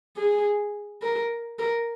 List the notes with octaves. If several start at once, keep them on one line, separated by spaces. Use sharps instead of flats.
G#4
A#4
A#4